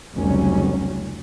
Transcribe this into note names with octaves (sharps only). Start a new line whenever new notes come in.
F1 C#2 F#3 G3 C#4